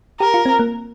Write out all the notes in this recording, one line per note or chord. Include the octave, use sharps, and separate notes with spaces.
G4 A#4
F4
C4
A#3